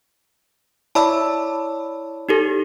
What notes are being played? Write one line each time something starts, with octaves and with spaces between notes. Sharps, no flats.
E4 C#5 D5 A5 B5 E6
D#4 G4 A4